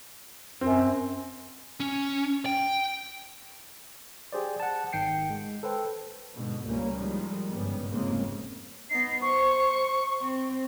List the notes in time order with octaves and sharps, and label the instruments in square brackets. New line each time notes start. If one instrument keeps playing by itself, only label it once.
[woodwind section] F#2 [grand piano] C4
[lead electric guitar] C#4
G5
[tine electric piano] G4 G#4 C5 D5
F#5 A5
G#1 D#3 G5 C7 C#7
G#3
A4 B4 C5 G5
[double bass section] G#2 B2 D3
C#2 G3 A#3 C#4
A2 D#3 F3 G3 G#3
G1 G#2 C#3 G3 B3
F1 G#2 C#3 G#3 A#3 C4
[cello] B3 D#4 [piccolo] C7
[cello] C5 [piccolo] C#6
[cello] C4